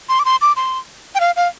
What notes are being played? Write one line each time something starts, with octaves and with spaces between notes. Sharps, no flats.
C6
D6
C6
D6
C6
G5
F5
F5